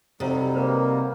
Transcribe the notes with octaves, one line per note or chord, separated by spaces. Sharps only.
C3 F#3 G3 D#4 A4 C5 F5
A#3 F#4 B4 C5